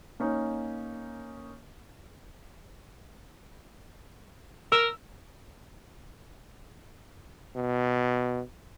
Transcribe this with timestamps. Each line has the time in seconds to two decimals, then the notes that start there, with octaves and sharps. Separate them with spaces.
0.20 A#3 C#4 D#4
4.72 A#4 E6
7.56 B2